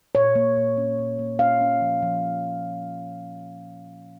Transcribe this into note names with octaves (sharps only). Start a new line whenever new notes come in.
A#2 C#5
A#3
A#2
C#4
A#2
A#3
C#4 F5
C#4
F3
F3